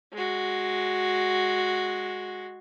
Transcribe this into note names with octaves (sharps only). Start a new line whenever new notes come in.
G#3 F#4